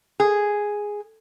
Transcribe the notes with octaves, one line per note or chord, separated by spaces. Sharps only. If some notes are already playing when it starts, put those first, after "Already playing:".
G#4